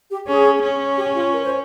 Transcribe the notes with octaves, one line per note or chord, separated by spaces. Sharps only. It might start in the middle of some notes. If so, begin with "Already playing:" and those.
G4
C#4 G#4
C#4
G4
F4
A#4
C5